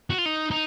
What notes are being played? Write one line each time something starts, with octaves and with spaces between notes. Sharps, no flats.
F#4
F4
D#4
D#4